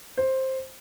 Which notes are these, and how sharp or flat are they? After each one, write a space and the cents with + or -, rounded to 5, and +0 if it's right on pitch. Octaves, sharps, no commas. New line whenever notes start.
C5 +10